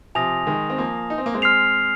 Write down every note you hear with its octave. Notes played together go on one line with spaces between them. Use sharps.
C3 F3 G#5 D#6 A#6 F7
D#3 G#3
C4
F3 A#3
D#4
C4
A#3
G#3 C4
F6 C7 F7